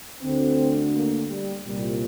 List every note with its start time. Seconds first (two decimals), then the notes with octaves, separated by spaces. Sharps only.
0.21 D2 D3 C4
0.94 A#3
1.29 G3
1.65 C2 A#2 G3